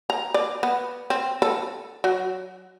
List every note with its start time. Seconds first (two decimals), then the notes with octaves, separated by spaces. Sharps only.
0.10 A#5
0.34 D5
0.63 B3
1.10 C4
1.42 A4
2.04 F#3